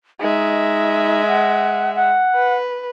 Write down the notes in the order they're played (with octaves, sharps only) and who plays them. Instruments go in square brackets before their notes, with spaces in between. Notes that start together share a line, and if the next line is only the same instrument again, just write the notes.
[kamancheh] G#3 E5 [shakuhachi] D#4
[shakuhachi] F#5
F#5
[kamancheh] B4